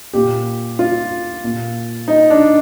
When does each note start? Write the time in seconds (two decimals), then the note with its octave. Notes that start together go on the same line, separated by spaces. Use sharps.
0.13 A#2 G4
0.79 F4
1.44 A#2
2.08 D#4
2.30 D4